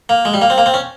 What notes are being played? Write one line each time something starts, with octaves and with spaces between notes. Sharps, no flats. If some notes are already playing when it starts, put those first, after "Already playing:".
A#3
G#3
G3
A#3
C4
A#3
C4
C#4